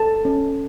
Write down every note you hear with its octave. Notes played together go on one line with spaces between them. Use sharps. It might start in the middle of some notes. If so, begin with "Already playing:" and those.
Already playing: A4 A5
C#4